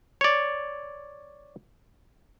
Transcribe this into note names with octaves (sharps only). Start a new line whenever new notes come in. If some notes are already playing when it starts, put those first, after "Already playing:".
C#5 D5